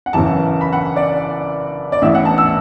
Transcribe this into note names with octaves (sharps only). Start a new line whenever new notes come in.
F#5
F#1 F#2 E3 A5
B5
F#5
D5
D5
A1 A2 E3 E5
F#5
A5
E6